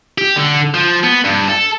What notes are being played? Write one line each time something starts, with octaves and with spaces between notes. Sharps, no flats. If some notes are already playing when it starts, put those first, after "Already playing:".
G4
D3
F3
B3
G2
A4